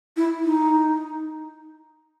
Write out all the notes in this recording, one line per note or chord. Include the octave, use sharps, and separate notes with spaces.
E4
D#4